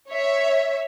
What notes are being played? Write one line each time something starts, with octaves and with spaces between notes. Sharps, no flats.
C#5 E5